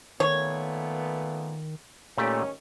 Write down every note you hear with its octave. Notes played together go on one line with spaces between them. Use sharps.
A#2 D#3 A3 B3 C#5
A#2 D#3 A3 C#4 G4